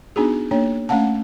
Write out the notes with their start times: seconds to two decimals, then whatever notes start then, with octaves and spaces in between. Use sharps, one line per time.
0.16 B3 D4 D#4 F#4 G#4
0.51 A#3 D4 C#5
0.89 A3 C#4 F5 F#5 A5